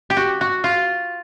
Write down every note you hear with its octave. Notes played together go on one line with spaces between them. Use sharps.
G4
F#4
F#4
F4